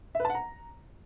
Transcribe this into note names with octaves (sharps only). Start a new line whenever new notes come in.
E5
B4
A5
F#5
A#5